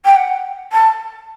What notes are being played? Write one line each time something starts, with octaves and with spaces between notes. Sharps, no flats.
G5
F#5
A5